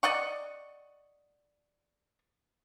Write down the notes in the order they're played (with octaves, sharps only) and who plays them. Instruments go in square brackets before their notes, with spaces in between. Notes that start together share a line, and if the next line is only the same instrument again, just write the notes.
[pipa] D5 D#5 F#5 C#6